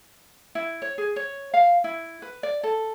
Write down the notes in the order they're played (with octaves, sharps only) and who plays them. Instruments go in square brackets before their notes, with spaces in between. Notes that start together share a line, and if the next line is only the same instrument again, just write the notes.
[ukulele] E4
C#5
G#4
C#5
F5
E4
B4
D5
A4